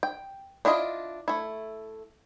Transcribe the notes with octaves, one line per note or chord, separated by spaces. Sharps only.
G5
D4 E4 F4 D#5
A3 E4